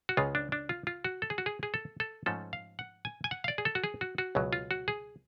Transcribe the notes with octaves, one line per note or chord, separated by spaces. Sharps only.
F#4
C#2 C#3 G#3 F4
D4
D4
F4
F4
F#4
A4
G#4
F#4
G#4
G#4
A4
A4
G#2 F3 A3 C#4 A4
F5
F#5
G#5
G#5
F#5
F5
D5
G#4
A4
F#4
G#4
F#4
F#4
C#2 B2 F#3
F4
F#4
G#4